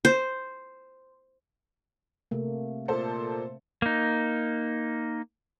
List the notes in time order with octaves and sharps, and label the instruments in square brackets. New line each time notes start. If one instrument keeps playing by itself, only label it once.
[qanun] C5
[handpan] C3 A3 A#3
[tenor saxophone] A#2 [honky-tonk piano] A4 C5
[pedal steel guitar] A#3 D#4